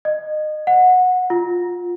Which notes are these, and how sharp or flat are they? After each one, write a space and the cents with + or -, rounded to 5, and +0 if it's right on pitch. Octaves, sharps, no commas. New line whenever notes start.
D#5 -25
F#5 -15
F4 +10